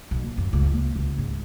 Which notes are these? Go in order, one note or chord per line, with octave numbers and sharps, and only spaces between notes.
B1
A#2
F#2
C#2
A#3
C#2
G#2